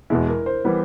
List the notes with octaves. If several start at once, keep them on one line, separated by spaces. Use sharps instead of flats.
E2 B2 G#3 E4
A#4
C5
E3 G3 B3